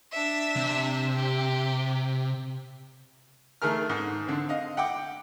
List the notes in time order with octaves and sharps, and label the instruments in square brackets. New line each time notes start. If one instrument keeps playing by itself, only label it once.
[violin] D4 E5
[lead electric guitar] C3
[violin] G4
[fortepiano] D#3 A3 G#4 A#4 F6
G#2
D3 C4
D#5 F5
F#5 G5 D6